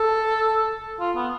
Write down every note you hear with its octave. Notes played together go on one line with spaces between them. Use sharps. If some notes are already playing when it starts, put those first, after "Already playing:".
Already playing: A4
F4
B3